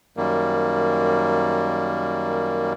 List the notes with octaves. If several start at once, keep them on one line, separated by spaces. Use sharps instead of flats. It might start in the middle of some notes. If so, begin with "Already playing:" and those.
F#2 D#3 G3 A#3